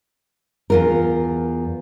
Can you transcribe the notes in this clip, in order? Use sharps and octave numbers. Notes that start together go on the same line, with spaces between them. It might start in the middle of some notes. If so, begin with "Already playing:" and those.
E2 F4 A#4